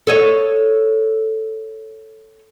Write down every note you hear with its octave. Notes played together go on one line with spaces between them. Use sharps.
A4 C#5 D#5